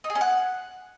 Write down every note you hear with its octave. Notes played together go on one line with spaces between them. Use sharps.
D#4
G#4
C#4
F#5